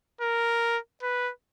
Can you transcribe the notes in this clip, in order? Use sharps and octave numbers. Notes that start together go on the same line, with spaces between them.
A#4
B4